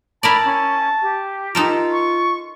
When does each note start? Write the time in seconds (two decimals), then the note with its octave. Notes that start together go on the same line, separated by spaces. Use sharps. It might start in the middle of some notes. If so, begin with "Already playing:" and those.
0.23 E4 A#4 D5 A5 B5
0.45 C#4
1.02 G4
1.55 D#4 F4 A4 A#4
1.92 C#6